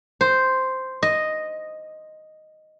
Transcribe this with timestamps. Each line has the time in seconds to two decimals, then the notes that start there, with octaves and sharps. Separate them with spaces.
0.21 C5
1.03 D#5